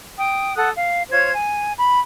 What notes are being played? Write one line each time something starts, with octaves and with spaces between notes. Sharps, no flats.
G5 D#6
A4 F#5 D#6 F#6
F5
F4 C5 C#5 G#6
G#5
B5